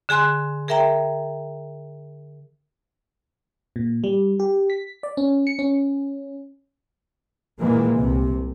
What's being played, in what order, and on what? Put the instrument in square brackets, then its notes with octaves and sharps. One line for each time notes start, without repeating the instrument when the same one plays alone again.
[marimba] D3 G#4 G#5 C6 F#6
G#4 A#4 E5 G5 A#5
[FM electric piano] A#2
G3
G4
B6
D5
C#4
C#7
C#4
[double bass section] A#2 D#3 E3 G#3 A#3
C2 C3